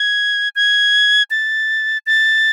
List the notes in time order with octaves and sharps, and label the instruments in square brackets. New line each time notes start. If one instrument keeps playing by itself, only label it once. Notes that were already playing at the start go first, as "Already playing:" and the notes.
Already playing: [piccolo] G#6
G#6
A6
A6